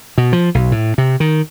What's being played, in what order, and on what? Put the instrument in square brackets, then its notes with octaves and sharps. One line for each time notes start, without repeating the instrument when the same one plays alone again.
[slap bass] B2
F3
B1
A2
C3
D#3